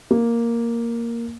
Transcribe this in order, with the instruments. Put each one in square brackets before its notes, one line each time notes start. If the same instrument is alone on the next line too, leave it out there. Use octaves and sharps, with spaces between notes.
[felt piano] A#3